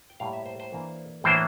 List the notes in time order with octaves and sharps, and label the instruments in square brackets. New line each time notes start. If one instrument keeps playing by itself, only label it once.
[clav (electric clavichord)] G5
A2 G3 A#3 F5
E5
C5
C5
E3 A#3 D4
A2 E3 A#3 D4 C5